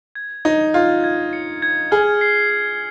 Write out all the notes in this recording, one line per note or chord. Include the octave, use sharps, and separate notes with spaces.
G#6
D#4 G#6
F4 G#6
G#6
C#7
G#6
G#4 F6
C7
C7